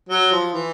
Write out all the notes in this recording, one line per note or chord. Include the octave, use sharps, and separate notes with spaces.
F#3
F3
E3